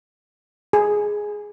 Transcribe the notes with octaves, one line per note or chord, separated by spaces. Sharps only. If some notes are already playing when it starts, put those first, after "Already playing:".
G#4